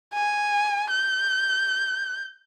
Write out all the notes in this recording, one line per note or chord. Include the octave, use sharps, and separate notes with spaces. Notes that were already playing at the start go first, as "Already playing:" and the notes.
G#5
G6